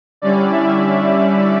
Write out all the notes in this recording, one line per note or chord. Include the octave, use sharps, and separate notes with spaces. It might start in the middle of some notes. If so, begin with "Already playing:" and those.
D3 G3 C#4 E4 D5
E5